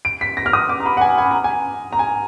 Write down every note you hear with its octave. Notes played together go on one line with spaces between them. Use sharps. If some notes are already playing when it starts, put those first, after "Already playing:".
D7
B6
A#6
F6
D#6
D6
A#5
B5
F#5
G#5
G#5
A#5
G#5
A#5
G#5